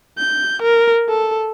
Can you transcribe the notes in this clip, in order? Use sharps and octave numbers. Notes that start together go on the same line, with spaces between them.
G6
A#4
A4